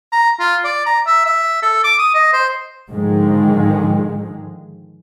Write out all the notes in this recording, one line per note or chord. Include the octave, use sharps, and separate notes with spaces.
A#5
F4
D5
A#5
E5
E5
A4
D6
D#6
D#5
C5
G#2 D3 D#3 F3 G#3